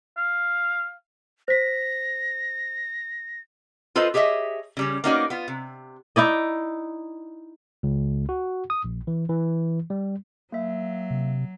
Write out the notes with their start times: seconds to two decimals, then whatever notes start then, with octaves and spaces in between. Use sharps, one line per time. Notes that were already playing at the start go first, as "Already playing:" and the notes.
0.17 F5
1.48 C5 A#6 B6
3.95 F4 A4 B4 C5 D#5
4.14 G4 G#4 C#5 D#5 E5
4.77 C#3 G3 C#4
5.04 A#3 B3 C#4 D#4 F#4 D5
5.30 B3 F4
5.48 C3
6.16 D#4 E4 D5 D#5
7.83 C#2
8.29 F#4
8.70 D#6
8.84 A#1
9.07 E3
9.29 E3
9.90 G3
10.52 F#3 A#3 E5
11.11 C3